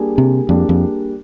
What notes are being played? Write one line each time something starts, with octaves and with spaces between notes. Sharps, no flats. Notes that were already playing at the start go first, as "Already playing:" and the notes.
Already playing: G3 A#3 D4 G#4
C3
F2 G3 A#3 D4 G#4
F2